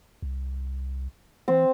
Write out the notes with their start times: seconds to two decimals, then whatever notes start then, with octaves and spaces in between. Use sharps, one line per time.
0.22 C2
1.48 E3 C4